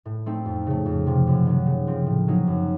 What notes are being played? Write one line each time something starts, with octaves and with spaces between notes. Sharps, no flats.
A2
A3 C4 D#4
F2
C#3 A3
F2
C3 F3
F#2
D#3 F#3
C#3
F3 C4
A2
F#3 A#3 D#4
F#2